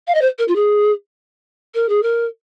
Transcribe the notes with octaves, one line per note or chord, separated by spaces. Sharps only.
F5
D#5
C5
A#4
F4
G#4
A#4
G#4
A#4